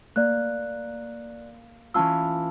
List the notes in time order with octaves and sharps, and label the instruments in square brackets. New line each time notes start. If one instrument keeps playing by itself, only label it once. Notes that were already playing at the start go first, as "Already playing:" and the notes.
[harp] A#3 [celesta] D5 F#6
[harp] E3 C#4 F4 [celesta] A5 E6